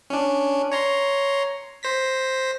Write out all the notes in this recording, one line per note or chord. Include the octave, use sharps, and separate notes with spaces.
C#4 D4
C#5 A#5 C6
C5 A#6 B6